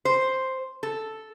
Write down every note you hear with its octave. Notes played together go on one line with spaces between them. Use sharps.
C5
A4